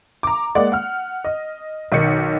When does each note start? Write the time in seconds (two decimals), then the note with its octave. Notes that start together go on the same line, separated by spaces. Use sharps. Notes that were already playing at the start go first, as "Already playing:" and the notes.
0.23 A#5 D6
0.55 G#3 A#3 D5 F#5
0.72 F#5 F6
1.24 D#5
1.92 B1 D#3 D#4 C#7